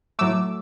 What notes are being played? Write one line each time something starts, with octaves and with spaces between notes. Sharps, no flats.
A2 F#3 A3 D6 E6